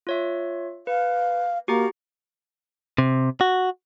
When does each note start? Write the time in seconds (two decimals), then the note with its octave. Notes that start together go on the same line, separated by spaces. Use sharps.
0.07 F4 C#5 E5
0.87 B4 F5
1.68 A#3 F#4 G4 A#5
2.98 C3
3.41 F#4